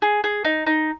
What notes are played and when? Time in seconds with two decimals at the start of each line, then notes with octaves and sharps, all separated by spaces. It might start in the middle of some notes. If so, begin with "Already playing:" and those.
0.02 G#4
0.24 G#4
0.45 D#4
0.66 D#4